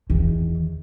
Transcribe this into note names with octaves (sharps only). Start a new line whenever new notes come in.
E2 D#3